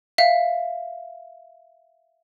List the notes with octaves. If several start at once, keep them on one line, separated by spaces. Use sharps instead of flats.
E5 F5